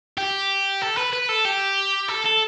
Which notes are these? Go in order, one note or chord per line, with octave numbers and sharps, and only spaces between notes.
G4
A4
B4
B4
A4
G4
A4
A4